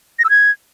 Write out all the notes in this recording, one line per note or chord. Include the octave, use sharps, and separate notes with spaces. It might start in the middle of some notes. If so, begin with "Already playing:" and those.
A#6
E6
G#6